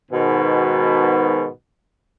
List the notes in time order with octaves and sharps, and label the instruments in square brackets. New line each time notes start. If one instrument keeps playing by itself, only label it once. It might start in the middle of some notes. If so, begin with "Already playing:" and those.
[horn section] G#2 B2 D#3